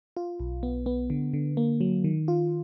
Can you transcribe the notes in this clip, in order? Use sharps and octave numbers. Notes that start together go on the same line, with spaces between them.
F4
B1
B3
B3
D3
D3
A#3
F#3
D#3
F4